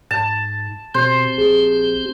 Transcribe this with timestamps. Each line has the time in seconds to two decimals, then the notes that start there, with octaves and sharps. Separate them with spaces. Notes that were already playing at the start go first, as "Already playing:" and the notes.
0.11 G#2 A5
0.95 B2 C4 G4 C5
1.38 A#1 G#4